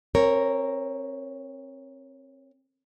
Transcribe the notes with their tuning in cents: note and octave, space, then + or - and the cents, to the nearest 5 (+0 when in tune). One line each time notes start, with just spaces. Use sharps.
C4 +30 A#4 +0 C#5 +0